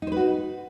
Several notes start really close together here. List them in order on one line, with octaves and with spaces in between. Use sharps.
D#4 C5 B4 F#4